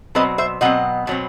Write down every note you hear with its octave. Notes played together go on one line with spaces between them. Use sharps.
B2 F#3 C4 B4 D#5
C5 E5
B2 F#3 C4 D#5 F#5
B2 F#3 C4